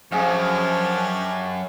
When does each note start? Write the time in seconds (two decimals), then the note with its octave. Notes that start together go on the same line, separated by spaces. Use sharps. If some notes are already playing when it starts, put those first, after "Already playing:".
0.12 F#2 F3 D4 G4 G#4 C#5 F5